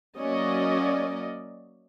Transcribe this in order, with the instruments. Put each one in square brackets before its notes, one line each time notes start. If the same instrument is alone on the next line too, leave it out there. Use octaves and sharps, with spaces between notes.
[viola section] F#3 A#3 C#4 D5 D#5